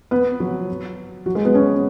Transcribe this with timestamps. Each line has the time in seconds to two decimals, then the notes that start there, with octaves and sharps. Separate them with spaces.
0.11 B3 B4
0.40 F#3 F#4
1.26 F#3 F#4
1.35 G#3 G#4
1.45 B3 B4
1.54 C#4 C#5